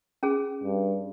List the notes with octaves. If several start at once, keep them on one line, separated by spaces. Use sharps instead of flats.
C#4 G#4
G2